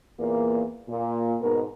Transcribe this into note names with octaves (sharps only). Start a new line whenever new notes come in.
E2 A#2 A#3
A#2
G#2 B2 A#4